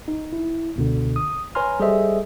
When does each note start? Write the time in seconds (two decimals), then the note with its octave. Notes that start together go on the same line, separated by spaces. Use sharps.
0.08 D#4
0.33 E4
0.76 C#2 B2 D3
1.16 D#6
1.55 B4 C#5 G#5 A#5 C6 F6
1.80 G3 G#4 A4 C5 D#5 E5